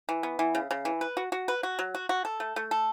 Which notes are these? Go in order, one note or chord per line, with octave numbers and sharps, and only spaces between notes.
E3
B3
E3
C#3
C#3
E3
B4
F#4
F#4
B4
F#4
F#3
F#4
F#4
A4
A3
A3
A4